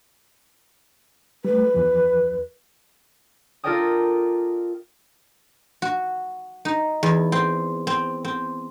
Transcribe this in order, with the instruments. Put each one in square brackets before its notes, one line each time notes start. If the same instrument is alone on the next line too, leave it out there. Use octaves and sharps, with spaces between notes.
[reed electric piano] G3 A3 [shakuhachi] B4
[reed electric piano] E2 F3
[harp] F4 A4 A#4 D5 G5 D#6
[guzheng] F#4
D#4
E2
C4
C4
C4